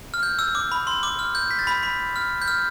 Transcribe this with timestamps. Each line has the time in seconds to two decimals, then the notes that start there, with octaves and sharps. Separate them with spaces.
0.14 F6
0.23 G6
0.39 E6
0.55 D6
0.72 B5
0.87 C6
1.03 D6
1.19 F6
1.35 G6
1.51 B6
1.59 A6
1.67 B5 B6
1.83 B5 B6
2.16 F6
2.42 G6
2.48 F6